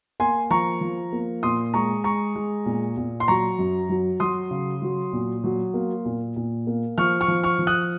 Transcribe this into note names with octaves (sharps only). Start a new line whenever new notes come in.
A#3 G#5 C6
F3 A#5 C#6
F3
A#3
A#2 C6 D#6
G#3 A#5 C#6
G#3 A#5 C#6
G#3
A#2
A#2
C6
F#3 A#5 C#6
F#2
F#3
F#3 C6 D#6
C#3
F#3
A#2
F#3
A#3
A#2
A#2
A#3
F3 C#6 F6
C#6 F6
F3
C#6 F6
F3
D#6 F#6